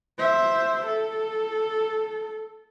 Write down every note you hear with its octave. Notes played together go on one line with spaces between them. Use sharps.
C5 E5
A4